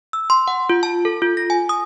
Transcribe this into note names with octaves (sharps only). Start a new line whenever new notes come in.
E6
C6
F#5
F4
A5
A4
F4
A#6
G#5
D#6